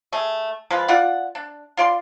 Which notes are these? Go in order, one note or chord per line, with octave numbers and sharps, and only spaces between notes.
A3 G#4
F3 G#3 F4 B4
F4 D5 F#5
D4
F4 D5 C6